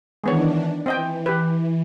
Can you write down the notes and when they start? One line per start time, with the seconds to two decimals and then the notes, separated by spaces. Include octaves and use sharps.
0.24 D#3 E3 G#3 B3 D4 C#5
0.86 E3 C4 D#5 G5
1.26 G4 B4